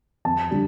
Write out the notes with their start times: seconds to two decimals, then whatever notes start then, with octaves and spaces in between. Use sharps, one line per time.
0.25 F2 A5
0.51 D3 G3 D4